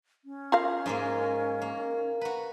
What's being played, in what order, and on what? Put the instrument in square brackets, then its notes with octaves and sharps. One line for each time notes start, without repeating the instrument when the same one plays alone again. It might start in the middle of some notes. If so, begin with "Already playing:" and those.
[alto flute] C#4
[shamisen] F4 A#4 F5
[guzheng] G#2 G#3 A#3
A#3
[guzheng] F#4 B4 [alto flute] A#5